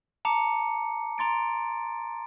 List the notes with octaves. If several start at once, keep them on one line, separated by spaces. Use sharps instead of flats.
A5 A#5 D6 C#7
A#5 C6 A6 D7